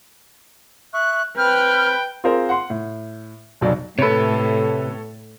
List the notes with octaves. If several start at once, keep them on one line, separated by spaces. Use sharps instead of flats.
E5 C#6 F#6
C4 B4 G5 F6 G6
C4 F4 G#4 A#4 C5
F#5 C6
A2
F1 B1 F#3 D5
A2 C3 A4 B4 C#5